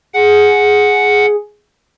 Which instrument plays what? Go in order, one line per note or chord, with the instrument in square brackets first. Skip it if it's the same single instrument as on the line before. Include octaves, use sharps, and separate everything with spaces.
[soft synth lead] G#4 [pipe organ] F#5